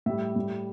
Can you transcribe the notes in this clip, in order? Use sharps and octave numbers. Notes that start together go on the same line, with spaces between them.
A2 G3 E5
A2 G3